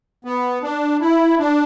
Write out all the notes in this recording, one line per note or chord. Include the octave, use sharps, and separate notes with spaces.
B3
D4
E4
D4